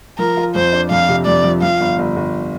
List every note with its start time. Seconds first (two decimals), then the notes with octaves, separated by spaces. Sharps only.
0.19 F3 A#4
0.37 F4
0.55 F2 C5
0.73 D4
0.90 F2 F5
1.08 C3
1.26 F2 D5
1.44 F3
1.62 F3 F5
1.80 G1
1.98 G1
2.16 G1